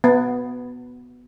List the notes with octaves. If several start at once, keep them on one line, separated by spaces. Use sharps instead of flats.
B3